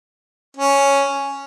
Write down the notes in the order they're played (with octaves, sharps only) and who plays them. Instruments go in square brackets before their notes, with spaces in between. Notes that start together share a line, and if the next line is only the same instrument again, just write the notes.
[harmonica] C#4